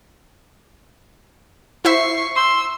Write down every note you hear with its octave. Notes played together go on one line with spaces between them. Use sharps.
E4 C5 E5 C#6 C7
C6 E6